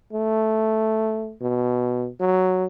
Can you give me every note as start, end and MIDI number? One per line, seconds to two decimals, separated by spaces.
0.13 1.33 57
1.41 2.08 47
2.20 2.65 54